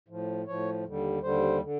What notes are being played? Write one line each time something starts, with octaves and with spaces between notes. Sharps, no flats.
A2 F3
A2 F3 C#5
D#2 D3 G3
D#2 D3 G3 C5
D3